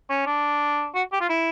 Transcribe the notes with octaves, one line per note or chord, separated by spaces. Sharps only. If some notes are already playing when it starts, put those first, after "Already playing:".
C#4
D4
F#4
G4
F4
E4